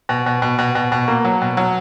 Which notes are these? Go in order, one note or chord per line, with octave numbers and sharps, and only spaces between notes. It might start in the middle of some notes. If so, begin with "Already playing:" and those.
B2
B2
B2
B2
B2
B2
A#3
F#3
B2
F#3